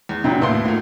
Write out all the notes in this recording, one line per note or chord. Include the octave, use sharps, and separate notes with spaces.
E2
F#2 A#2 D4 G5
D#2 A2 B3 C6
D2 A#2